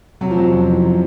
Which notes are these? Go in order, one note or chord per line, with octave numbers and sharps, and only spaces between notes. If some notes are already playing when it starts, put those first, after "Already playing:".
C3 F#3
F3
F2 F#3
F2
E3
C3